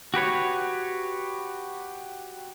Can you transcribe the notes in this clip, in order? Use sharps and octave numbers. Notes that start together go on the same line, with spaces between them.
F#4 G4 B4 C#5